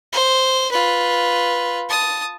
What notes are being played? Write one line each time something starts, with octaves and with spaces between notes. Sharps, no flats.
C5
F4 B4
A5 D#6